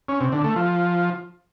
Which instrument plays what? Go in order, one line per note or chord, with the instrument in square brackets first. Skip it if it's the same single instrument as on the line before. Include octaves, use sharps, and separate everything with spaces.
[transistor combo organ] C#4
C3
D3
A3
F3